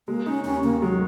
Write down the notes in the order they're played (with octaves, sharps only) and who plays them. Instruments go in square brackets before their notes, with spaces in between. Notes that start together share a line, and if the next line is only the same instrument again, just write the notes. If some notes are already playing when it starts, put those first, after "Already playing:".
[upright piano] G#3 [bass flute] A#3
[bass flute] C#4 [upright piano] D#4
[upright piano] D#2 [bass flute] C#4
[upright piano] D#3 [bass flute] A#3
[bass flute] F#3 [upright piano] G#3